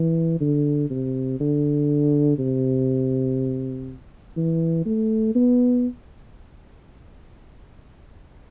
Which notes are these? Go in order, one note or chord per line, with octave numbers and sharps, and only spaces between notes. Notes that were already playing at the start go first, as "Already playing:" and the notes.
Already playing: E3
D3
C3
D3
C3
E3
A3
B3